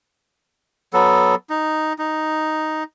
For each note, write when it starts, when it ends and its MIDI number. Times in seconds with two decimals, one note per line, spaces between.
0.93 1.35 54
0.93 1.35 59
0.93 1.35 69
1.50 1.93 63
1.99 2.83 63